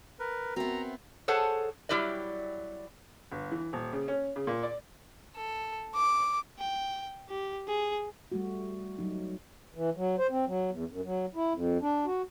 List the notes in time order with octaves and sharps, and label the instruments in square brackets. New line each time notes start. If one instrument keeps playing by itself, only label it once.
[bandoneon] A#4 B4
[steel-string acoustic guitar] B3 C4 [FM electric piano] F#4 A#4 E5 [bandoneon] A#5
[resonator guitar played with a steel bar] G#4 A4 C5 C#5 F#5 A5
F#3 G3 E4 G4 B4 D5
[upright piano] G1
E3
D#1
C#3
C#4
C#3
A#2
D5
[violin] A4
D6
[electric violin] G5
G4
G#4
[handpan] G3 A3 F#4
F#3 D#4
[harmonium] E3
F#3
C5
C4
F#3
E2
F#2
F#3
E4
F2
D4
F#4